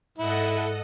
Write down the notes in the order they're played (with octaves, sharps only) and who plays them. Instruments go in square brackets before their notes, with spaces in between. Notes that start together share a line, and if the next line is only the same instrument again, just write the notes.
[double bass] G#2 [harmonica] E4 [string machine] A4 D#5 F#5